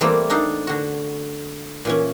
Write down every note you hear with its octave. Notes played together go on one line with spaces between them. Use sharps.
E3 G3 A3 A#3 C4
D4 D#4 A4 F5 F#5
D3 F#4
A#2 E3 C#4